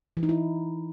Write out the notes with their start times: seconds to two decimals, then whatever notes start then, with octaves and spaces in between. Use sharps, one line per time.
0.17 E3
0.23 D#4
0.29 E4